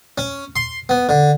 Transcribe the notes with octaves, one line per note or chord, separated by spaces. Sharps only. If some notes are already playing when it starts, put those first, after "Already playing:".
C#4
C6
B3
D3